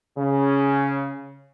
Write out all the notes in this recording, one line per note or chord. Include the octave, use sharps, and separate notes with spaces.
C#3 C#4